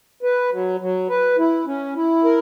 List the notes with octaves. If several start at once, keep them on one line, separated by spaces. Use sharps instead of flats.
B4
F#3
F#3
B4
E4
C#4
E4
A#4